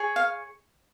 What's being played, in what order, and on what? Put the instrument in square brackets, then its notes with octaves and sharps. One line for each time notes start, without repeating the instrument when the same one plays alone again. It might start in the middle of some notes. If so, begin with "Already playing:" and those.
Already playing: [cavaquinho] G#4 C#5
F5